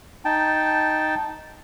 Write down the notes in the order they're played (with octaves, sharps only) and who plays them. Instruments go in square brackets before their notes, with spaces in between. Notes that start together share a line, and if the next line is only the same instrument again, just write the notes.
[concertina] D#4 G5 A5